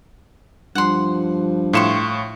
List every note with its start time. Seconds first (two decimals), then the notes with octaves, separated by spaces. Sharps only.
0.75 G2 F3 F#5 C6
1.73 A2 C#5 F5 C6 C#6 E7